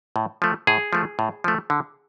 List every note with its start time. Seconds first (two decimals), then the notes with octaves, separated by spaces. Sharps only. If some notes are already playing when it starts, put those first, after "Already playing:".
0.16 A2
0.42 F3 A3
0.67 A2 G#4
0.93 F3 A3
1.19 A2
1.44 F3 A3
1.70 D3